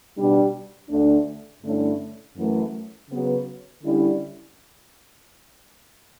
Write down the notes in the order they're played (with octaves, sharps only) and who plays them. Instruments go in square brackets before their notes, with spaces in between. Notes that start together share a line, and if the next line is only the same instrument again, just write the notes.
[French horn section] B2 G3 D4
D2 D3 A3 D4
G2 D3 A3 C#4 E4
F#2 E3 A3
C#3 F#3 B3
D3 G3 C#4 E4